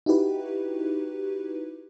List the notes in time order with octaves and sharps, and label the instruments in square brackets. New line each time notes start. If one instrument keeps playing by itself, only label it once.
[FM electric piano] D#4 E4 F#4 G4 B4